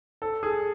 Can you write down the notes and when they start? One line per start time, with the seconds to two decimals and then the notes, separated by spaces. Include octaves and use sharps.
0.22 A4
0.43 G#4